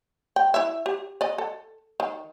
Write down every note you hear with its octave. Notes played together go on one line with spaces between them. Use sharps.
G5
E4 E5
G4
D5 D#5
A4
D#3